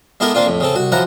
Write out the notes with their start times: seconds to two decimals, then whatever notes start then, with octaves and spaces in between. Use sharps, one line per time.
0.20 G#3 B3 E4 G4 A4 A#4
0.34 A#3 C4 D4 F4
0.46 F2 A2
0.60 C#3 C4 A4
0.74 C2 F#4
0.92 F#2 F3 E4 F#5 A#5